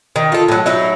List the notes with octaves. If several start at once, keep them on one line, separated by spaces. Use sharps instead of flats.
D#3
F4 A4
A2 F#3
F#3 D#4 E4